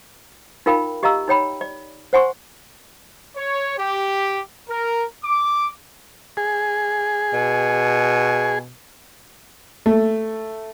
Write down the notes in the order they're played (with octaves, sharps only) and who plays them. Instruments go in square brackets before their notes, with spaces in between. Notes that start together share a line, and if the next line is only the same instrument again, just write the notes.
[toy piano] D#4 F4 A#4 F5 G5 B5
G4 D#5 F5 A#5 E6
D#4 C#5 G5 B5
D5
C5 F#5 G#5 C6 C#6
[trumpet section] C#5
G4
A#4
D6
[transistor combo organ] G#4
[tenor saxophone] B2
[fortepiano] A3